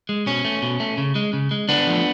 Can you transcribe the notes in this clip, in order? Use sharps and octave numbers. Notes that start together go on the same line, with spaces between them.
G#3
B2 C#4
A3
B2
A3
C#3
G#3
C#3
G#3
D3 B3 D4
F3 A3